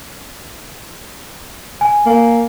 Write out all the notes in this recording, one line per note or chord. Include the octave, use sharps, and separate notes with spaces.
G#5
A#3